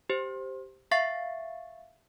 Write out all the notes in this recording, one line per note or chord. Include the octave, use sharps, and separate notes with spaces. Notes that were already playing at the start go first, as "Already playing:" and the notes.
G4 C5
E5 F5 C#6 A6 C7